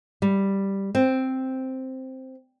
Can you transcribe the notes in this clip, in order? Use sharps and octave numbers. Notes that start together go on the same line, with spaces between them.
G3
C4